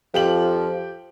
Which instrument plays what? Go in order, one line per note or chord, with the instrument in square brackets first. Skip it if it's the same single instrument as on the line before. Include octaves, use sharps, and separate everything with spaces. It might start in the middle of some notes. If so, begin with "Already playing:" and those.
[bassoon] F2 [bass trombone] F3 [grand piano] G4 G5 F#7